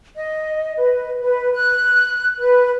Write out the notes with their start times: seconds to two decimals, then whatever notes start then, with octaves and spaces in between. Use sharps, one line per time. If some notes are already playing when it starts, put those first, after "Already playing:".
0.15 D#5
0.78 B4
1.22 B4
1.53 F#6
2.40 B4